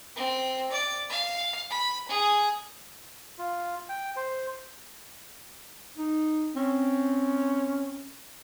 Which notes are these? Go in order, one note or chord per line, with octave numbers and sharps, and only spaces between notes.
C4
D5
F5
B5
G#4
F4
G5
C5
D#4
C4 C#4